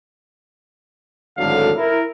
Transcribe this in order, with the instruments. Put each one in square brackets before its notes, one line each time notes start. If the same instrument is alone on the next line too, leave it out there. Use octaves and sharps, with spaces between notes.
[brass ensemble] G#1 A2 D3 F#3 A4 F5
E4 A#4